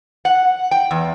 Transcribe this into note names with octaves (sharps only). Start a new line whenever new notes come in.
F#5
G5
E2